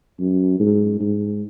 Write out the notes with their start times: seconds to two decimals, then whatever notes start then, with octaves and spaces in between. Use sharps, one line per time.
0.20 F#2
0.60 G#2
1.00 G#2